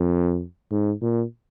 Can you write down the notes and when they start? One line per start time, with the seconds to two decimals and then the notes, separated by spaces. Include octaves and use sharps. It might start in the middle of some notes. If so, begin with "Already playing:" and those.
Already playing: F2
0.71 G#2
1.02 A#2